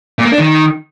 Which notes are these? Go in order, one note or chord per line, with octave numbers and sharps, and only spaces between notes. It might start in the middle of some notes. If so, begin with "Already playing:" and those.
A#2
A#3
D4
D#3